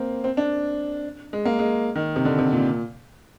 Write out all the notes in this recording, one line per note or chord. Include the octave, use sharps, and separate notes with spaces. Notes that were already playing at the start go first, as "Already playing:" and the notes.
Already playing: A#3 C4
C4
D4
G#3
A#3
G#3
D#3
C3
D3
C3
A#2